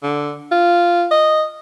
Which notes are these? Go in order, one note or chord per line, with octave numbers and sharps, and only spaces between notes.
D3
F4
D#5